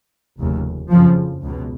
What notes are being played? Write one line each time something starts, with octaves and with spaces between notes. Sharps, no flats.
F1 D#2 C#3
F#1 F2 C#3 F3
C#2 B2